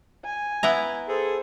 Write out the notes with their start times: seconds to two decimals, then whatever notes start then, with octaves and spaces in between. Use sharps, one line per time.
0.25 G#5
0.63 B3 E4 A#5
1.08 G#4 A4 C5